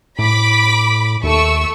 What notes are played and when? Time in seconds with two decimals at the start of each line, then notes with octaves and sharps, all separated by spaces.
0.19 A2 B5 D6 B6
1.23 D#2 A3 C#6 E6